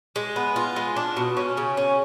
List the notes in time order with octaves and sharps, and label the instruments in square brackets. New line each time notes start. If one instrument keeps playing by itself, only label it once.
[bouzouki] G#3
B3
F4
G#3
D4
B2
C#4
C#3
C#4